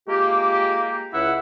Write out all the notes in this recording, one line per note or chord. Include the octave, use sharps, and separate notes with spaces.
G#3 A#3 F4 G4
C#2 E4 F#5